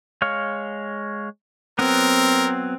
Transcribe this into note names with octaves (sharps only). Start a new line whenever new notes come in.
G#3 C#5 F5
F#3 B3 C4 A#4